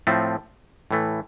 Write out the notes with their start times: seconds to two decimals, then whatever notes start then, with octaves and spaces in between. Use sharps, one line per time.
0.07 A2 F3 A3 C4
0.91 A2 E3 A3